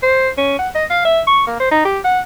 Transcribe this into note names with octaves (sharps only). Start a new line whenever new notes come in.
C5
C#4
F#5
D#5
F5
E5
C#6
A#3
C5
D#4
G4
F#5